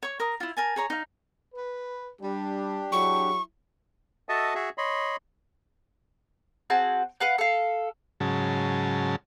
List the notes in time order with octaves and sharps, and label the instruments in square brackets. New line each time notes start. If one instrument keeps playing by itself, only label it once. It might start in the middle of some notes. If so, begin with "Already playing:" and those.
[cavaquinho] C#5 C#6
A#4 A#5 D#6
E4 F4
A#4 G#5 A5
G#4 C#5 A#5
D#4 F5
[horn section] B4
[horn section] G3 [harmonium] D4 G4
[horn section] F#3 E4 G#4 [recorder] C#6
[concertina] F#4 A4 D#5 E5 A5 D#6
F#4 G#4 E5
C#5 D#5 B5 C6
[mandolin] C4 F#4 G#4 A5
B4 F5 F#5
A4 F5
[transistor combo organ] G#2 C#3 F#3 A5